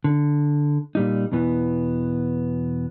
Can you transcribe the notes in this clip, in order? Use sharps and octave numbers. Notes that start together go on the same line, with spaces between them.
D3
A#2 G3 D#4
E2 B2 E3 B3